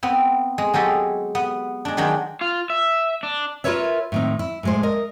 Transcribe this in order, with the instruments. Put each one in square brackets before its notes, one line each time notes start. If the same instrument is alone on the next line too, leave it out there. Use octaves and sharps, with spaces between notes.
[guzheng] B3 C4
G#3
F#3 G#3 G4 A4 D#5
B3
G#3 D4
D#3 F#3 G#3 D4 G5
[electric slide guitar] F4
E5
D4
[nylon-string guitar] F4 G4 A#4 B4 C#5 E5
A2 D#3 C4
E4
A2 G#3 C5
A#4 D#5